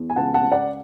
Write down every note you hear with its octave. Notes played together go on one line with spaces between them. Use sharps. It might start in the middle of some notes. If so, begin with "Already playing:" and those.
Already playing: E2
G#5
C#2 F#5 A5
F#5 A5
C#2
D5 F#5